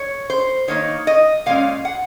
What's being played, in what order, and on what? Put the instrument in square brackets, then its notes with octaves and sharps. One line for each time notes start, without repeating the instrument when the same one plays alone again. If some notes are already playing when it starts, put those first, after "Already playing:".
Already playing: [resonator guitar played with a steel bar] C#5
C5
D#3 A#3 D#4 C#5
D#5
A#2 G#3 C#4 F5
F#5